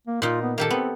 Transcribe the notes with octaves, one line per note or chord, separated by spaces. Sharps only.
A#3
A#2 D#4 F4
B3
D#3 A#3 G4 A4
B3 C4